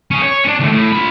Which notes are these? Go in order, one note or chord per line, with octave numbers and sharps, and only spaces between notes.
C#4 G#4
C#5
C#4 D4
D#2 A3
A2
F4 B5